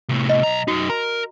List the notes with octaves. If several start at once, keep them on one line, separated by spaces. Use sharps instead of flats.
A2 C3
D#5
B1 A#5
F#2 D#4 F#4
A#4 A#5